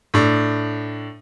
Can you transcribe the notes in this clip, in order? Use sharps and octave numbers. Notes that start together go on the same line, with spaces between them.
A2 D4